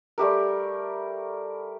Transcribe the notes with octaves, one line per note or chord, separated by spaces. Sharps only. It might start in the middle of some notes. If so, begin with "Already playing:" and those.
G3 A3 G4 A#4